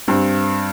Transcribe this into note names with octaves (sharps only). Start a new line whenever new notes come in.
G2 C4